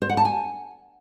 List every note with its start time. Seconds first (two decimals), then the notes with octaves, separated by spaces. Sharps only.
0.02 C5
0.09 F#5
0.17 A5
0.25 G#5